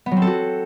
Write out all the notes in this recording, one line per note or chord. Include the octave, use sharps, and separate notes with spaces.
B3
F#3
C4
A4
F#4